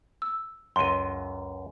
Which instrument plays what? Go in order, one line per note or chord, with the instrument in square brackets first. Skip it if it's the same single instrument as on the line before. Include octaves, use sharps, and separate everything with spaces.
[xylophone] E6
[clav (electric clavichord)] C#2 F#2 [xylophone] C6 D#7